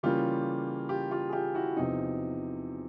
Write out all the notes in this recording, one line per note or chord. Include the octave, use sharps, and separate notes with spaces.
C#3 E3 G3 A#3 C#4 F4 G4
F4 G4
F4 G4
G#4
F4 G4
E4 F#4
E2 C3 F3 D#4